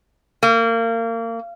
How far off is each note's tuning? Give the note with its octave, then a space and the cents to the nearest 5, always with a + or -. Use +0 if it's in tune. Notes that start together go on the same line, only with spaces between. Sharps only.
A#3 -30